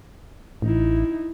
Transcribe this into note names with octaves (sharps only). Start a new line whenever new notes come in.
A1 D#4 E4